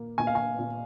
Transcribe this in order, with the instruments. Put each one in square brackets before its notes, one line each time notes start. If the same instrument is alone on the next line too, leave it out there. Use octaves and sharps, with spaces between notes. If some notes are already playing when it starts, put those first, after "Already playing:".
Already playing: [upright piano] A#2 A#3
A#2 G#5
F5
G#5
A#2